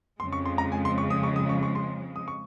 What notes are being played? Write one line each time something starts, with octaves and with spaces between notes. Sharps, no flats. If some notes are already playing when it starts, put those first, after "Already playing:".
F2 C#3 G#3 C6
C#6
C6
A#5
G#5
C6
C#6
D#6
C#6
D#6
C#6
C#6
C6
D#6
C#6